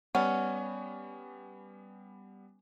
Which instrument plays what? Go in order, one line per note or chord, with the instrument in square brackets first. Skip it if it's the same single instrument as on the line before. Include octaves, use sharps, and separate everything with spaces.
[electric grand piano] G3 B3 [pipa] C#4 [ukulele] D5 F#5